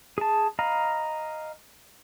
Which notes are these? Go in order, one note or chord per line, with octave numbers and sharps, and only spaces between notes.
G#4 A5
D#5 F5 A#5 B5